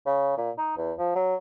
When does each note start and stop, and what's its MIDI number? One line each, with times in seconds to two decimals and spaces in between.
0.06 0.37 49
0.37 0.50 46
0.58 0.75 63
0.78 0.93 40
0.98 1.15 53
1.15 1.35 54